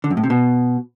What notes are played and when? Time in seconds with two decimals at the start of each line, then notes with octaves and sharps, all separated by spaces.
0.04 D3
0.10 F#2
0.17 A2
0.24 C3
0.30 B2